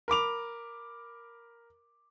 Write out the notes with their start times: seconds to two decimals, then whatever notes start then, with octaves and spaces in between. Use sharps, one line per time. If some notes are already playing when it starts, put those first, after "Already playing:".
0.08 A#4 B5 D6 F7